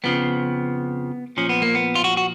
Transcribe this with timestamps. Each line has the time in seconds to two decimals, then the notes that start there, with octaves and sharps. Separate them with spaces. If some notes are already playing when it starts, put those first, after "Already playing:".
0.04 F2 C#3 F3 B3
1.37 A#2 F3 C#4
1.49 B3
1.62 A#3
1.75 B3
1.95 F4
2.04 F#4
2.17 F#4